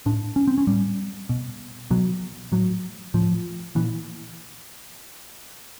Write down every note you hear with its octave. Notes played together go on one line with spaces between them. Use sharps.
A2 D4
C#4
C4
C#4
A2 G3
B2
B2 F#3
A2 F#3
A2 F3
A#2 E3